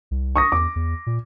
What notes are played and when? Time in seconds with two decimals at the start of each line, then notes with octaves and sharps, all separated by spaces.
0.11 C2
0.36 C#6 D#6 A#6
0.52 E2 D6
0.76 E2
1.07 A#2